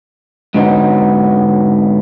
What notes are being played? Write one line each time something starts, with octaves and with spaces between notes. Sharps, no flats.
G#2 D3 F#3 B3 C4 D#4